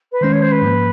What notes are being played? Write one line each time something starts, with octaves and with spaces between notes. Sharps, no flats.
B4
D#3 G#3 C#4 C5
C#5
C5
B4
G#2 F3 A#3